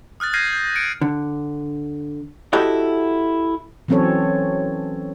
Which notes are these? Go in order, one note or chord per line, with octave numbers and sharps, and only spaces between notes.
D#6 F6 F#6 A6
F6 G6 G#6 A#6 C7 D#7
G6
G#6 C#7 D7
D3
E4 F#4 G4 A4 D#5 F#5
E3 F#3 C4 C#4 A4 C#5